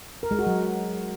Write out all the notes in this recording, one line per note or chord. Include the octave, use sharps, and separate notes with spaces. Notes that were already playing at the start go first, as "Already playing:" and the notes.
A#4
G#3
F#4
F#3